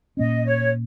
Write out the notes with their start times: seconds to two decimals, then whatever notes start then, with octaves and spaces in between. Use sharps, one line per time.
0.17 A#2 A#3 C#4 D#5
0.45 C#5